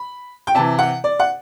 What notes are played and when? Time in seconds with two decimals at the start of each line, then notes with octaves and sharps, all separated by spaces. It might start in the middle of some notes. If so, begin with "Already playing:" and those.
Already playing: B5
0.47 G5
0.55 C3 E3 A5
0.79 F#5
1.04 D5
1.20 F#5